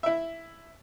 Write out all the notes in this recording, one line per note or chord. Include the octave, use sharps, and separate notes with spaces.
E4 E5